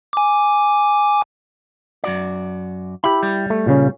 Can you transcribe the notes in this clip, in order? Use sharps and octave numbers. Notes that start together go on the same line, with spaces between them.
G#5 D6
F#2 F#4 D5
E4 G4 B5
G3
A3
A#2 C#3 C#4